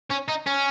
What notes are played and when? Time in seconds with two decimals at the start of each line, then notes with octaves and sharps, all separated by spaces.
0.11 C#4
0.29 D#4
0.47 C#4